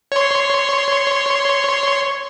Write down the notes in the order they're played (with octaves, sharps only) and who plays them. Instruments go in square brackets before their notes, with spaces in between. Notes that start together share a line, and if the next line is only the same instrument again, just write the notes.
[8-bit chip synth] C#5 C6